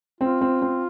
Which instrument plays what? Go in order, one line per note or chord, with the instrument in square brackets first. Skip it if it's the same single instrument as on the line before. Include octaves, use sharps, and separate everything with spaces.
[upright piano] C4 [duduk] F4
[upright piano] C4
C4